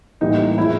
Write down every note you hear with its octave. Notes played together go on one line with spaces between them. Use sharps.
A1 A2 E3 G3 A#3 D#4
F3 G#3 E4